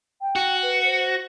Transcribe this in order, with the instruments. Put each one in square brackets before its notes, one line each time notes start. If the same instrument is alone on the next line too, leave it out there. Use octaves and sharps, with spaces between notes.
[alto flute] G5
[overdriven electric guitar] F#4
[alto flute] B4
C5